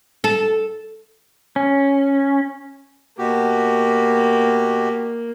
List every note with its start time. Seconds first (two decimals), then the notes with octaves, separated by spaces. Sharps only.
0.24 A4
1.56 C#4
3.18 B2 A#3 F#4 G4